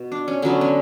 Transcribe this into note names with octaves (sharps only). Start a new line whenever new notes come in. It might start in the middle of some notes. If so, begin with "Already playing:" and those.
Already playing: B2 F#4
D4
C#4
D3 F#3 B3 C#4
C#4